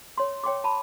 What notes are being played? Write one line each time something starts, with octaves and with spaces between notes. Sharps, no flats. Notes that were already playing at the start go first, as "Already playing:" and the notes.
C#5 C6
C#5 G5 C6 D6
A5 B5